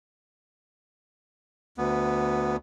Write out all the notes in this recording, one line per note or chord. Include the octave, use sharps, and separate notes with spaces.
D2 B3